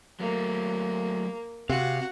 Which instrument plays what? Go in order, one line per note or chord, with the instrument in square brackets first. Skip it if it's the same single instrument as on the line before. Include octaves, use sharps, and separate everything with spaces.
[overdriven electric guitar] F#3 A3 [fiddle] A#3
[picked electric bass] C3 [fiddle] F#4 [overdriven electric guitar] F5